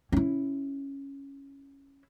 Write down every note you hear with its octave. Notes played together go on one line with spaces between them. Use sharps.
C#4 E4